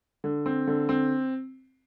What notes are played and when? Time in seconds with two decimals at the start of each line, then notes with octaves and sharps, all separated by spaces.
0.24 D3
0.46 C4
0.67 D3
0.89 C4